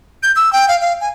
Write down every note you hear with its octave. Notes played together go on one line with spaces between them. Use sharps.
G6
E6
G5
F5
F5
G#5